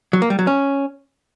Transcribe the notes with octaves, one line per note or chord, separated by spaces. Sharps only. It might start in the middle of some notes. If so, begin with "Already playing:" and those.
F#3
A#3
G3
F#3
C#4